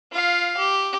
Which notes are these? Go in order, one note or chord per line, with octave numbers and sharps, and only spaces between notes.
F4 F5
G4